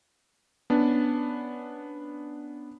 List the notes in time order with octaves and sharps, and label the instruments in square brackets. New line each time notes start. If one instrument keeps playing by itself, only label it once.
[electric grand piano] B3 C#4 D4